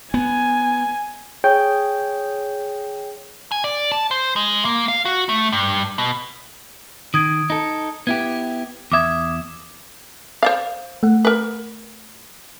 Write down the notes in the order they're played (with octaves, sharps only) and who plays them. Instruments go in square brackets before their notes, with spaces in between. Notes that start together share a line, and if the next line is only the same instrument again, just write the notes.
[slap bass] B3 [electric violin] G#5
[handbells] G#4 C#5 G5 G6
[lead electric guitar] G#5
D5
A5
C5
G#3
A#3
F5
F#4
A3
G2
B2
[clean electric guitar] D#3 [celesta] D#6 G#6 D7
[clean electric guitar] D#4 A4
[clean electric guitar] B3 E4 G4 [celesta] G#6
[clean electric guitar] E2 E5 [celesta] D6 D#6 G#6
[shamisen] C5 D5 F5
[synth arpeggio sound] A3 F#5
[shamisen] A#4 B4